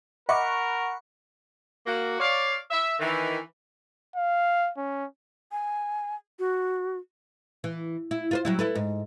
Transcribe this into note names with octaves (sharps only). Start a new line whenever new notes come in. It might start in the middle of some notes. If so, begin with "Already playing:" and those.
A#4 D#5 E5 F#5 B5 C#6 D6
A#3 F#4
C#5 D5 F5
E5
D#3 E3
F5
C#4
G#5
F#4
E3
E4
F4 B4 C5
F#3 G3 E4
E4 A4 B4
G#2